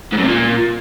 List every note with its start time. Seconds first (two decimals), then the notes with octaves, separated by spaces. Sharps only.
0.13 G#2
0.18 F#2
0.23 C3
0.28 A#2